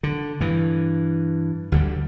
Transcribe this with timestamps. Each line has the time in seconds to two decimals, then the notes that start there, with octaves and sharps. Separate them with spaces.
0.03 D3
0.41 G2 E3
1.72 D2 D3 G3